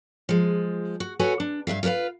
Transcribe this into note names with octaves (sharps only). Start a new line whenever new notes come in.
F3 G#3
F#4
F#4 A4 B4 C#5 F#5 G#5
D4
G2 E3 E5 F5
F4 G4 A#4 B4 F5